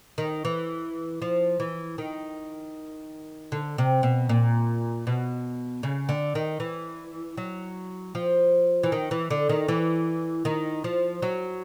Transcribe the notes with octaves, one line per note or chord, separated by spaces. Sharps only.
D#3
E3
F3
E3
D#3
D3
C3
B2
A#2
B2
C#3
D3
D#3
E3
F#3
F3
E3
D#3
E3
D3
D#3
E3
D#3
F3
F#3